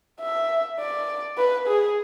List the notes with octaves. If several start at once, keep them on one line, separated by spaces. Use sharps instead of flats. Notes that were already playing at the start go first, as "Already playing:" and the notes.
E5
D5
B4
G#4